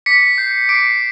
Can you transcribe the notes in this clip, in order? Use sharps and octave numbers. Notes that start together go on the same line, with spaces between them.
D6 B6 C#7
G6 C7
D6 C7 D7